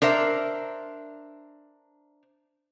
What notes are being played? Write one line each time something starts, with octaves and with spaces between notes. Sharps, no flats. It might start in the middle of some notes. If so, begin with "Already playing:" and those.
D4 A#4 C5 E5